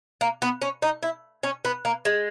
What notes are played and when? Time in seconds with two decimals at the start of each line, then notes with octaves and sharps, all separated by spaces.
0.21 A#3
0.42 B3
0.62 C#4
0.82 D#4
1.03 E4
1.43 C#4
1.65 B3
1.85 A#3
2.05 G#3